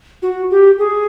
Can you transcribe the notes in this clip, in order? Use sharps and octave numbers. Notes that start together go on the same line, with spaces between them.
F#4
G4
G#4